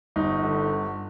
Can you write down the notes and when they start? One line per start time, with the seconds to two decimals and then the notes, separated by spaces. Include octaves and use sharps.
0.16 G1 D#4
0.43 D3